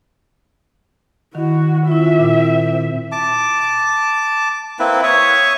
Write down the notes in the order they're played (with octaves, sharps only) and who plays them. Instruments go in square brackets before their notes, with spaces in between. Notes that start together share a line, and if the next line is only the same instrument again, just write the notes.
[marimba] D#3 [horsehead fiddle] E4 F#4
[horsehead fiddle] C4 E5 [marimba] E4 F4
[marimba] A#2
[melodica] A5 D6
A#3 C4 E4 B4
C#5 E5 C#6 D#6